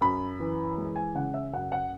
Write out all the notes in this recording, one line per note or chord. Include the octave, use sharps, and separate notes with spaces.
F#2 B5
E3
G#3
G#5
C#3 F#5
E5
F#2 F#5
F#5